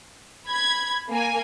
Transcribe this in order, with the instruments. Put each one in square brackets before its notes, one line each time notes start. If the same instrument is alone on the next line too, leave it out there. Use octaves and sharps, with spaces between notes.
[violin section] B5 G#6
A#3 G#5